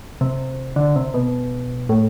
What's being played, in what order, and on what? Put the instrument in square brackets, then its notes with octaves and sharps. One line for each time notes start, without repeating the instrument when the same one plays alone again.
[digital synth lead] C3
D3
C3
B2
A2